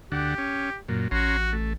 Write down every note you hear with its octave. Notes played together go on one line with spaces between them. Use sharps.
D2 D3 G4 F#5
C#4
F#2 A#2
A1 C#4 F#4 A#5 C6
A3